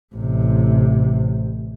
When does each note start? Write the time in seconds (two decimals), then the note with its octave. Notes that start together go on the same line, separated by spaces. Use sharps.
0.15 A1 C3